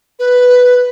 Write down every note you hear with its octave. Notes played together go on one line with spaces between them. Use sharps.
B4